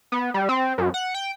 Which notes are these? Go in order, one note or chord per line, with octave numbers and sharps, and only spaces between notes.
B3
G3
C4
F#2
F#5
G5